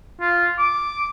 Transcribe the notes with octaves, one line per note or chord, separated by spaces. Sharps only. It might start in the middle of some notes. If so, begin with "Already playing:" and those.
F4
D6